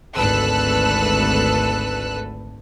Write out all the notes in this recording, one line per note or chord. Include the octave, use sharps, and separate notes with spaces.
G#1 D2 A4 B4 E6 F#6